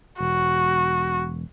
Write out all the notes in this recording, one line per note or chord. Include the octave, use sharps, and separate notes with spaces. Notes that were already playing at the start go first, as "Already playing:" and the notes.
E1 F#4